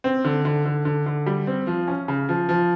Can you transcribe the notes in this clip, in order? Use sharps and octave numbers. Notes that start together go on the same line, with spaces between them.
C4
D3
D3
D3
D3
D3
G3
C4
F3
C#4
C#3
F3
F3